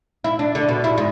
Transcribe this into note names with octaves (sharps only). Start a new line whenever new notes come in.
E4
D4
D3
B2
E4
G#2